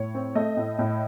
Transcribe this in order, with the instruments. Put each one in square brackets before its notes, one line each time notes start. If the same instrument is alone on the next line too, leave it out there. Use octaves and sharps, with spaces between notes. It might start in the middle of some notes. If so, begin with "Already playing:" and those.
Already playing: [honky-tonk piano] A2 C#5
C4
A3 D#5
A2
A2